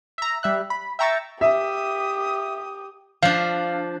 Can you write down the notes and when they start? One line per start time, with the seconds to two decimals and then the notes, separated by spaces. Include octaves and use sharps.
0.18 E5 A#5
0.43 G3 E5 F#6
0.70 B5
0.99 E5 G5 A#5 C#6 E6 A6
1.41 G4 E5 D#6
3.23 F3 D4 F5